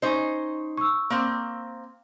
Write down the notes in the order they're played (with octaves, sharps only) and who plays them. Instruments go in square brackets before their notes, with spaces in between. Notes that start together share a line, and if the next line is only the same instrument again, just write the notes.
[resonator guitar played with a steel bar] C#4 D#4 C5 [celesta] D#5 C#6
[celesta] C#6 E6
[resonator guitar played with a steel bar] A#3 C4